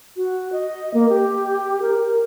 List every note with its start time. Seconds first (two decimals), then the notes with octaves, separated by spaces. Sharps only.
0.16 F#4
0.53 D#5
0.94 A#3
1.09 G4
1.82 A#4